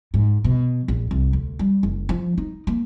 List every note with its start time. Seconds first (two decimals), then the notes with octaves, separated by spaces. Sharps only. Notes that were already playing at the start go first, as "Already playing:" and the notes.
0.14 G#2
0.44 B2
0.88 A#1
1.11 C2
1.33 D2
1.59 G3
1.83 F#1
2.09 F3
2.38 D#4
2.67 A#3